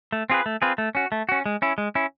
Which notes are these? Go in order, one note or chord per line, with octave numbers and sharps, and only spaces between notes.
A3
C4 F4 G#4 B4
A3
C4 F4 G#4 B4
A3
C#4 F#4
A3
C#4 F#4
G#3
C#4 E4
G#3
C#4 E4